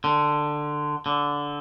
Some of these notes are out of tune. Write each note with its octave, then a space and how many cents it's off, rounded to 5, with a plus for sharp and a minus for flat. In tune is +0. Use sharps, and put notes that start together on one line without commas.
D3 +15
D3 -15